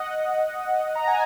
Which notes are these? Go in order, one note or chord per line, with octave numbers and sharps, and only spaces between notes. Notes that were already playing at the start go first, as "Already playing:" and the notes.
Already playing: D#5 F#5
A#5
G#5